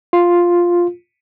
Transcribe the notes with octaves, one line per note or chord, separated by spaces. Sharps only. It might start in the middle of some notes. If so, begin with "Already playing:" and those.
F4